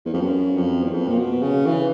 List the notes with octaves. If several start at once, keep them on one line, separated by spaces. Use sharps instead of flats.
E2
F2
F#2
F2
E2
F2
A#2
B2
C#3
E3